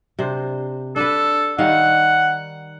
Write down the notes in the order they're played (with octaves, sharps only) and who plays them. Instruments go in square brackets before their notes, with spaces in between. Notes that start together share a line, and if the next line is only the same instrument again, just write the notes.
[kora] C3 D4 C5
[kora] D4 B4 [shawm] A4
[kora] D#3 G3 F5 [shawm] F#5